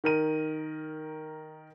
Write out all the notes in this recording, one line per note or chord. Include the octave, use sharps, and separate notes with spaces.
D#3 A#4 D#7